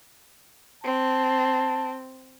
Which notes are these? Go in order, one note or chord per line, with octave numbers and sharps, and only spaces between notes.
C4 A5